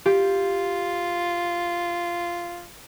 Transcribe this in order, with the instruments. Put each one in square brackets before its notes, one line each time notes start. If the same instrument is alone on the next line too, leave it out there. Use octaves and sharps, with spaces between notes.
[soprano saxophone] F4 [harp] G4